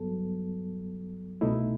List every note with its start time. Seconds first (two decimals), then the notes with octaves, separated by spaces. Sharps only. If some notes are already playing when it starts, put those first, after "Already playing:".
Already playing: G2 F#3 B3 A4
1.41 C2 B2 A3 D#4 E4